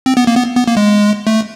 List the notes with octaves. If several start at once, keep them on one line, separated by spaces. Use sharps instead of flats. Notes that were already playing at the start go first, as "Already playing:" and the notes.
C4
B3
A#3
B3
B3
A#3
G#3
A3